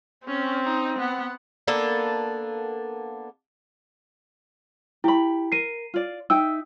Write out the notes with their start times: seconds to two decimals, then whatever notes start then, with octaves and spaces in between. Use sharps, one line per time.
0.28 C4 C#4
0.65 D#4
0.98 B3 F#5
1.68 A#3 B3 D4 A4
5.04 E4 G4 B5
5.52 A#4 C7 D#7
5.94 F4 D5
6.30 D#4 E5 G5 E6